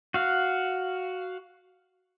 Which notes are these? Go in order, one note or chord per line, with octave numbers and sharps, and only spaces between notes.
F#4 F5